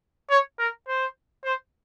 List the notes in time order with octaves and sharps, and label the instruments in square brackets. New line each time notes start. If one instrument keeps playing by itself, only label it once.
[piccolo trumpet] C#5
A#4
C5
C5